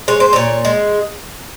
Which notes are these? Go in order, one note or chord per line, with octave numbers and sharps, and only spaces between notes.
G#3 C#5
C5
A#2 C#5
G#3